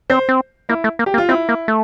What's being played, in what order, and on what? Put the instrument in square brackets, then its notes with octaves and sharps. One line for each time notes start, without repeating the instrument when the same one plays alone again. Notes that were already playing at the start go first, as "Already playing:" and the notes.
[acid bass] C4 [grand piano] C5
[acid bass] C4
[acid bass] A#3 [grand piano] E4
[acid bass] A3
A#3
[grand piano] G4
[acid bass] A#3
[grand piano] F4
[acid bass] C4 [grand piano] E4
[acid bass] A#3
A3